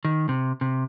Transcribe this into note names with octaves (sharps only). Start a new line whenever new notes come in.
D#3
C3
C3